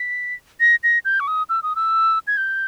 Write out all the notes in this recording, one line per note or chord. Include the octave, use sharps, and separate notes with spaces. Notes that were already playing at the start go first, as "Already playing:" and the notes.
Already playing: B6
A#6
A#6
G6
C#6
D#6
E6
D#6
E6
G#6
G6